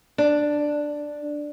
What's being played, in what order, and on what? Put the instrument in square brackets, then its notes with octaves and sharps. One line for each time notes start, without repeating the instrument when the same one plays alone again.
[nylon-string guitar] D4